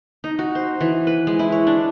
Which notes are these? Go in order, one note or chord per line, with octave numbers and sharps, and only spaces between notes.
D#4
F#4
C5
E3
B4
G#3
E4
C#5
D4